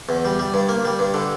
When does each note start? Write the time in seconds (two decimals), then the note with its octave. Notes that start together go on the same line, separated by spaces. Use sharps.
0.09 E2
0.25 G3
0.39 G3
0.54 G2
0.69 A#3
0.85 G3
0.99 G2
1.14 D3